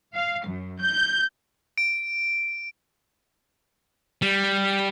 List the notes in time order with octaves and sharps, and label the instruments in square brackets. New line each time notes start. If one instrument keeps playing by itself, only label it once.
[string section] F5
F#2
G6
[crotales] D7
[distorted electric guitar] G3